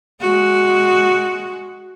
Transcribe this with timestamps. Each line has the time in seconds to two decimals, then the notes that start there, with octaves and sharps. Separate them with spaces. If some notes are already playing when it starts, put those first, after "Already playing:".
0.21 G#3 F#4